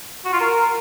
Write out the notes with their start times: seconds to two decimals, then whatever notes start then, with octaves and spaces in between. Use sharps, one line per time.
0.25 F#4
0.33 F4
0.40 A#4